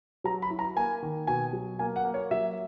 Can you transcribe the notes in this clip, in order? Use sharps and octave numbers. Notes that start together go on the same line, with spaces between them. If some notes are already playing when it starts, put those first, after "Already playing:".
F#3 A#5
B5
E4
A#5
A#3 G#5
D#3
B2 G#5
F#3
A#3 G#5
F#5
A#3
C#5
F#3 E5